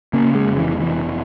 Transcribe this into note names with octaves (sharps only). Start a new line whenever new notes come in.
C#3 A#3
G#3
F1
E3
F1 E3